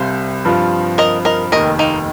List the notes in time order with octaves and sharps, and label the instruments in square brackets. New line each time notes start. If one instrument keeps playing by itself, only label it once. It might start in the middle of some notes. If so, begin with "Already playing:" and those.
Already playing: [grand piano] C2 C3 G3 [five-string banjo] C5 F5
[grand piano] G2 F3 C4 F4
[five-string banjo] A#4 D#5
A#4 D#5
[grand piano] F1 D#2 D#3 [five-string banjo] A#4 D#5
[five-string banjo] A#3 D#4